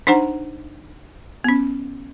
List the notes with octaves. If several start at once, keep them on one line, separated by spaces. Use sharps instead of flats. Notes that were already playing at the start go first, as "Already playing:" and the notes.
D4 D#4 C5 F#5 A#5
B3 C#4